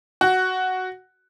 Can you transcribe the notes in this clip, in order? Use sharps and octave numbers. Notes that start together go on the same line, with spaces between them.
F#4